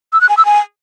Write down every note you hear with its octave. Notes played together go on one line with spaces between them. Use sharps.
E6
F#6
G#5
E6
G#5